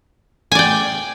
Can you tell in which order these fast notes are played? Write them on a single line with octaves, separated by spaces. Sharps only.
G#5 D5 G5